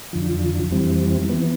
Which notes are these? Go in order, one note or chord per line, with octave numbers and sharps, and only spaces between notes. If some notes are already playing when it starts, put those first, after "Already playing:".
F2 D3 F3
F2 E3 G3 C4
E3 B3